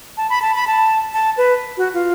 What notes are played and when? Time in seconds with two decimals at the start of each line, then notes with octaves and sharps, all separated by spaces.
0.17 A5
0.30 B5
0.42 A5
0.55 B5
0.67 A5
1.14 A5
1.37 B4
1.77 F#4
1.94 F4